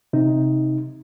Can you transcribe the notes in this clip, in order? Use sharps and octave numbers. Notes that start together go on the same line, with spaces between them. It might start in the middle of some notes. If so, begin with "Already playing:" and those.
C3 D#4